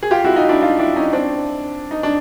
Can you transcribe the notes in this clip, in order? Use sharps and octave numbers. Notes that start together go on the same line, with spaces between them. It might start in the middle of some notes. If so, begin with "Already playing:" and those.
G#4
F4 G4
E4 F#4
D#4 F4
D4 E4
D#4 F4
D4 E4
C#4 D#4
C4 D4
D#4
D4